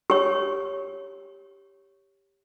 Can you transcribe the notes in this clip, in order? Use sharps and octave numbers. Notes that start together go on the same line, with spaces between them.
G4 C#5